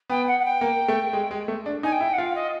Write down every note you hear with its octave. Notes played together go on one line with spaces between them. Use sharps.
B3 G5
F#5
F#5
G5
A#3
A3
G#3
G#3
A3
D4
D#4 G#5
G5
E4
F#5
F4 F5
D#5